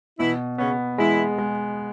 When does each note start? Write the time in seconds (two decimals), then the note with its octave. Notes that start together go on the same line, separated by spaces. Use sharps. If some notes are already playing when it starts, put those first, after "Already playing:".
0.18 B2 E3 E4
0.58 C#3 B3 C#4
0.98 E3 G#3 E4
1.38 G#3